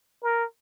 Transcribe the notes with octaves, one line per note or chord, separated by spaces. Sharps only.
A#4